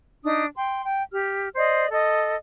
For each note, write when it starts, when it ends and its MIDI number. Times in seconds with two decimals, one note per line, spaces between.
0.24 0.46 62
0.24 0.46 63
0.24 0.46 87
0.55 0.83 79
0.55 0.83 84
0.84 1.02 79
1.11 1.49 67
1.11 1.49 89
1.56 1.88 72
1.56 1.88 74
1.56 1.88 75
1.91 2.36 69
1.91 2.36 75